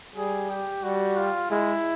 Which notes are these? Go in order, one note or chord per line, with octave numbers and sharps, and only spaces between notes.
G3 G#4
G4
G3 F#4
F4
G#3 E4